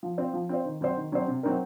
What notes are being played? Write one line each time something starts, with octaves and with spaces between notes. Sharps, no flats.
F3
C4 F4 C5
F3
C4 F4 C5
D#3
F#3 C4 F#4 C5
D#3
F#3 C4 F#4 C5
C3
F#3 C4 D#4 A#4